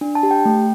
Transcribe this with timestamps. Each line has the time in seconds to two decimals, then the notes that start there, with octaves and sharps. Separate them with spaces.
0.01 D4
0.15 A5
0.23 G4
0.31 G5
0.45 A3